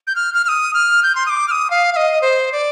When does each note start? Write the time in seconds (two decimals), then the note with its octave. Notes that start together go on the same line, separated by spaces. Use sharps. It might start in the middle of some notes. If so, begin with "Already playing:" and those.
0.07 G6
0.16 F6
0.34 F6
0.45 F6
0.48 D#6
0.74 F6
1.03 G6
1.15 C6
1.26 D#6
1.30 D6
1.48 F6
1.51 D#6
1.70 F5
1.93 F5
1.96 D#5
2.22 C5
2.52 D5